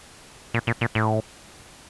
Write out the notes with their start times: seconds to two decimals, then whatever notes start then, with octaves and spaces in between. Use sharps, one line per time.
0.54 A#2
0.67 A#2
0.81 A#2
0.95 A2